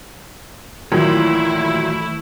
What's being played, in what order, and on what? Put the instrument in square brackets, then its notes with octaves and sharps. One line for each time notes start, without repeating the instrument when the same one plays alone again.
[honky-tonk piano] A#2 D#3 F#3 [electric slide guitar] E3 C#5 [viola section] A3 E4